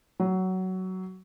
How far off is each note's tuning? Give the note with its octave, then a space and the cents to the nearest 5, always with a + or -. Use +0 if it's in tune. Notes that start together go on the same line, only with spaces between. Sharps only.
F#3 +15